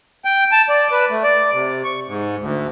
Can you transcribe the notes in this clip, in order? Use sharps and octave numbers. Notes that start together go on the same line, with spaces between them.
G5
A5
D5
B4
A3
D5
C3
C#6
G#2
D2